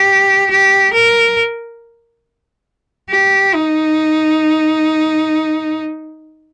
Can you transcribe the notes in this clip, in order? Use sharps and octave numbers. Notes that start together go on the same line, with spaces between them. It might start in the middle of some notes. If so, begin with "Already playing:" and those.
Already playing: G4
G4
A#4
G4
D#4